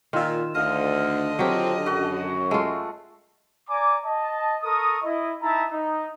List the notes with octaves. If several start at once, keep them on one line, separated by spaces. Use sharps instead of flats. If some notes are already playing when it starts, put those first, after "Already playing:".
A#2 D#3 F4 E6
D2 D3 D#5 F5
F#3 C4 F4 G4
F#2 F#4
G#3 A3 F4
D5 G#5 A#5 D6
D#5 A5
A4 A#4 C#6 D#6
E4 D#5
D#4 E4 E5 A5 A#5
D#4